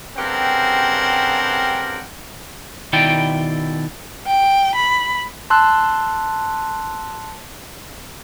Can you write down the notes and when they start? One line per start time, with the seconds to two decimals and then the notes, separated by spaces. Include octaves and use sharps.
0.17 G2 C#3 C4 G4 A#4 F#5
2.93 B2 D#3 E4 D5 G5
4.27 G5
4.75 B5
5.50 A5 C6 E6 F#6